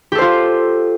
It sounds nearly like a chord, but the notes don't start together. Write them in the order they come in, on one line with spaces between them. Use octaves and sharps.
G4 A4 C5 F4